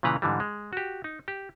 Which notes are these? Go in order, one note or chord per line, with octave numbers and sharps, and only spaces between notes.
A#2 C#3 E3 B4 A#5
G#2 D3 E3 G3
G#3
F#4 G4
D#4
G4